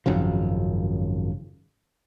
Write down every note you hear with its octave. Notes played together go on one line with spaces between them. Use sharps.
G#1 F#2 C#3 F3